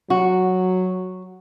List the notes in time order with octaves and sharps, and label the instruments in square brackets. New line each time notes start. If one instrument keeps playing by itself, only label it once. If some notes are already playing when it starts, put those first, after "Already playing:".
[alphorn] F#3 [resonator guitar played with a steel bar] F#4